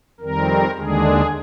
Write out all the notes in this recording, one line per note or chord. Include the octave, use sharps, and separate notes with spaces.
F2 D#3 G3 C4 A#4
D#2 D3 G#3 D4 G#4